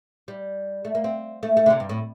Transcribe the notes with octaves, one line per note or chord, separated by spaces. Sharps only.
G3
A3
A#3
C4
A3
A3
D3
C3
G2
A2